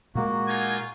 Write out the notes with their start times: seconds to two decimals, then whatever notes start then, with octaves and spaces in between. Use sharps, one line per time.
0.15 A#2 G#3 A#3 F#4
0.47 D#4 F4 G#5